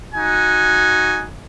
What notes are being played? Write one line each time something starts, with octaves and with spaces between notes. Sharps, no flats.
D#4 F#4 G#5